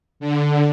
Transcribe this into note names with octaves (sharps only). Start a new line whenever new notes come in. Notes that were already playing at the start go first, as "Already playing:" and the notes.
D3